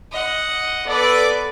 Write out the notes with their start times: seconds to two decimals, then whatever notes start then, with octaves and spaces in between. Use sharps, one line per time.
0.12 D#5 F#5
0.87 B3 A4 B4 D5